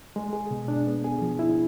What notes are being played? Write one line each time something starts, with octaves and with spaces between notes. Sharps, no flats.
G#3
G#4
B2
D4
B3
G#4
F3
E4